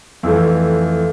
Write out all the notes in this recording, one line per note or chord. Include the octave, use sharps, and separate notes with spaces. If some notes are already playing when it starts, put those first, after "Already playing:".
F2 E3 A3